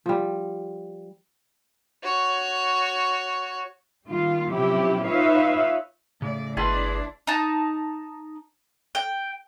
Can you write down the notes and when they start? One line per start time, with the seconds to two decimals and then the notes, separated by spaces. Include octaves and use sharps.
0.06 F3 G3
2.03 F#4 C#5
4.08 D#3 G3 A#3 F4
4.50 C3 F3 F#3 C#4 E4 G4
5.06 D#4 F4 B4 C#5 E5 F5
6.22 A2 C#3 D5
6.57 G1 D4 E4 G#4 B4 A5 C6
7.27 D#4 A5
8.95 G5